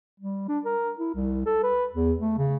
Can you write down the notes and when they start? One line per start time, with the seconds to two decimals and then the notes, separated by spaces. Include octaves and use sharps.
0.20 G3
0.48 D4
0.65 A#4
0.99 E4
1.14 C2
1.46 A4
1.63 B4
1.93 E2
2.20 A3
2.38 C#3